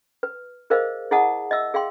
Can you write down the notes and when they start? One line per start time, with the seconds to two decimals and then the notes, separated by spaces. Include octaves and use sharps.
0.23 B4
0.70 G#4 A#4 C5 D#5 F5
1.11 E4 G#4 D#5 F#5 A5 D#6
1.51 D#5 E5 E6
1.74 G#4 F5 G5 C6